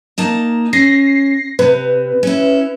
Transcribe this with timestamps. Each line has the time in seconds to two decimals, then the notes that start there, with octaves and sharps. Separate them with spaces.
0.18 A#3 D#4 A5
0.73 C#4 A#6 C7
1.59 C3 B4
2.23 C#4 E4